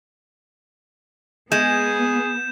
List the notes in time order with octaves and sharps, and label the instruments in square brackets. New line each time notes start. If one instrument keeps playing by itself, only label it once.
[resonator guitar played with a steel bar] G#3 [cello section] B3 [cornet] G#4 [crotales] G6 E7